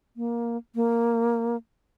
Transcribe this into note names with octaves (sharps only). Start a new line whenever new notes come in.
A#3
A#3